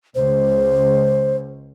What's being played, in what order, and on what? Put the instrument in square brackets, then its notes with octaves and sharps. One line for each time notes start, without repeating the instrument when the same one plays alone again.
[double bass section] C#2 [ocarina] C5